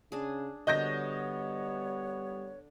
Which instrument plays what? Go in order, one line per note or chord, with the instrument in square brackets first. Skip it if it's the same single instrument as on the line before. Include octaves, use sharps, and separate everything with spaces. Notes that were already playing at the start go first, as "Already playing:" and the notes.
[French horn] C#3 [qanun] D4 G#4
[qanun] D3 F#4 [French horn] G3 [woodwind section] B3 C#5 [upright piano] D#5 G6 A#6